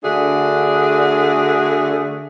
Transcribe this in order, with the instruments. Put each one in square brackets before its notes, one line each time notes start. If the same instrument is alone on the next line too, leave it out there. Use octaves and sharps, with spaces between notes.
[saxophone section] D3 A3 D4 F#4 G#4